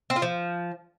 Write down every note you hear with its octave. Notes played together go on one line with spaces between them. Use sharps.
C4
F4
F3